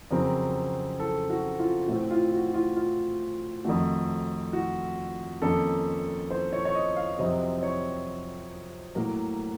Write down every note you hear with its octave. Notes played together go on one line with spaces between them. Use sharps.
F2 C#3 F#3 C4 A#4
A4
F#4
F4
A2 A3 C4 F#4
F4
F#4
F4
F4
F2 D#3 A3 F#4
F#4
F2 D#3 A#3 C#4 A4
C5
C#5
C#5
D#5
F5
F2 C3 F#3 C4 D#5
C#5
A2 F#3 A#3 A#4